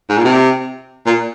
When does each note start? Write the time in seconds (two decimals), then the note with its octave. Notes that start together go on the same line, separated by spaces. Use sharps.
0.09 G#2
0.18 A#2
0.25 C3
1.06 A#2